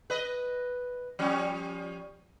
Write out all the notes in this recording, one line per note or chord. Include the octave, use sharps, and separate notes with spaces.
B4 D#5
F3 G3 C#4